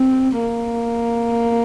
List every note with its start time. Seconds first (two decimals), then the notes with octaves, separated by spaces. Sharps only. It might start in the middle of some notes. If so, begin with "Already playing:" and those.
Already playing: C4
0.40 A#3